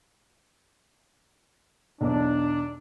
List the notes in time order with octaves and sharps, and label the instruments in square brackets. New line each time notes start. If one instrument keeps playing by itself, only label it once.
[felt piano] B1 E2 [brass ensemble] D4